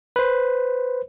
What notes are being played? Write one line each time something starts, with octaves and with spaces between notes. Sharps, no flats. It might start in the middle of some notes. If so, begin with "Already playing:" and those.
B4 C5